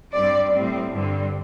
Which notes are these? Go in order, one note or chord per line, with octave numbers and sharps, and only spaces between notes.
G2 G3 C4 D5
A2 G3 C4
G2 D3 G3 C4